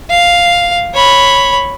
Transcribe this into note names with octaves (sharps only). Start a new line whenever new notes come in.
F5
C#5 B5